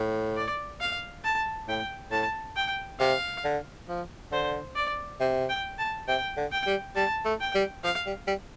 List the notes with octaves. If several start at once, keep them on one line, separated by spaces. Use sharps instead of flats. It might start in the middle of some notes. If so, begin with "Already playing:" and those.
Already playing: A2
D5
F5
A5
A2 G5
A2 A5
G5
C3 F5
D3
F3
D3 C5
D5
C3
G5
A5
C3 G5
D3
G5
G3
G3 A5
A3
G5
G3
F3 F5
G3
G3